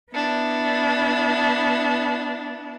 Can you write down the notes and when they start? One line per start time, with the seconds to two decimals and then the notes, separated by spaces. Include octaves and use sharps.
0.12 B3 D4 E4